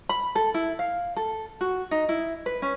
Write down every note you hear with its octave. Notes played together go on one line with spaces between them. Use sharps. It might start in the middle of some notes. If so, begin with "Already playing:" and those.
B5
A4
E4
F5
A4
F#4
D#4
E4
B4
C#4